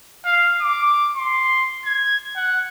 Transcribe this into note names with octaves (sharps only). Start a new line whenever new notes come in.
F5
D6
C6
G#6
F#5